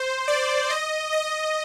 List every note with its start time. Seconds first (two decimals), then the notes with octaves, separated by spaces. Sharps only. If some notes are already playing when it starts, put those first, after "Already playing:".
Already playing: C5
0.28 D5
0.70 D#5
1.13 D#5